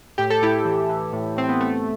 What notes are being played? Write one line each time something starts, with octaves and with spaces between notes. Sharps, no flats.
A2 G4
A4
A2 E4 G4
E3
E3
A2
A2 C4
B3
A2 A3